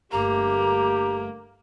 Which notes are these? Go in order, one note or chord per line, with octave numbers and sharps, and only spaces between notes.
G1 G2 A3 A#3 G4 A#5